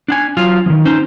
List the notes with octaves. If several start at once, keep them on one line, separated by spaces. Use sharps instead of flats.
D4 F#5 G#5
F#3 F4 F5
D#3 F3
C#4 D#4 C5